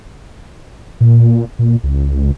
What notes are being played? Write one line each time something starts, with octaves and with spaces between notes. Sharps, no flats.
A#2
A#2
C#2